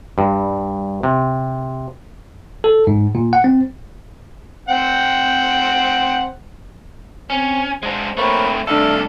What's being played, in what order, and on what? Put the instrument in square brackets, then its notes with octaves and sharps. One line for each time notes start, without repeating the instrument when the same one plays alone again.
[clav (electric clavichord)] G2
C3
[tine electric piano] A4
G#2
A#2
F#5
C4
[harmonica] C4 F#5 G5
[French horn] C4 [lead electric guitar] C#4
[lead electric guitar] G#3 D4 [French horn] C5
[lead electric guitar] A3 C4 [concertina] A#3 B4 C#5
[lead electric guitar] C2 A4 [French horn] A3 [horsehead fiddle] D4 [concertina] E5 F5